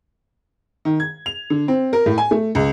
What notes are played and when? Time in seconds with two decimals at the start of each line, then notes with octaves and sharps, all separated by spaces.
0.85 D#3
1.00 G#6
1.26 F7
1.50 D3
1.68 C4
1.93 A#4
2.06 A2
2.18 G#5
2.31 A3
2.55 C#2